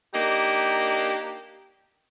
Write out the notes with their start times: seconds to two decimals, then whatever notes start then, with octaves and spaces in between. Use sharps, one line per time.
0.14 A#3 D4 D#4 G4